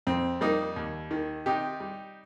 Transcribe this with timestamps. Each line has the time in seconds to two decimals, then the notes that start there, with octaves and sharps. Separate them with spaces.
0.07 F2 C4
0.41 G3 A#3 D#4
0.76 D#2
1.11 D#3
1.46 C3 D#4 G4
1.80 G3